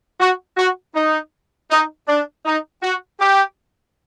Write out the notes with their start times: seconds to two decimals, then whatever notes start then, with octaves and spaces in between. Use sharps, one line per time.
0.20 F#4
0.57 F#4
0.94 D#4
1.71 D#4
2.08 D4
2.45 D#4
2.82 F#4
3.20 G4